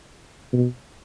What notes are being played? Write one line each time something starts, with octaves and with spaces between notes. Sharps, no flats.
B2